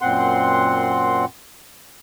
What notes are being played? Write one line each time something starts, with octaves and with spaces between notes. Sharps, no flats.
F#2 A#2 C4 F#5 C6